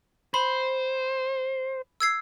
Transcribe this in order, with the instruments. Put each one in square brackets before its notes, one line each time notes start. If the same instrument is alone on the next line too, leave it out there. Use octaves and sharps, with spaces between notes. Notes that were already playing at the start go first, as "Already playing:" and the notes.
[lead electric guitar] C5 [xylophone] B5
[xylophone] E6 G#6 C7